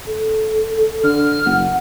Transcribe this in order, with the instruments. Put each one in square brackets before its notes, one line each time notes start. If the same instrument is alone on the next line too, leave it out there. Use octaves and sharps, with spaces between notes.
[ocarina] A4
[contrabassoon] D3 [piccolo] F6
[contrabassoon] F#1 [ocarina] F#5